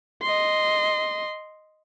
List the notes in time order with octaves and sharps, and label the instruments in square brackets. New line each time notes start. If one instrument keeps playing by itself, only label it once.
[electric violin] D#5 C6